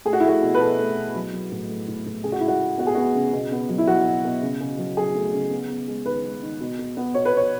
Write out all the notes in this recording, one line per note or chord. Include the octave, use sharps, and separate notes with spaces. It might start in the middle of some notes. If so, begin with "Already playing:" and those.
A3 G#4
F#4
E4
A3 F#4
B2
B4
B2 A4
A3
B2
F#3
F#3
A2
A3
A2
A2
C#3 G#4
F#4
G#3 E4
F#4
G#3
B3 F#4
G#4
B3 F#4
C#3
B2
B3
F#3
E4
F#3 F#4
B2
B2
C#3
C#3
F#3
F#3 G#4
A3
C#3
B3
B3
G#3
D#3 B4
G#3
D#3
B2
B2
B3
B2 C#5
B4
B2 C#5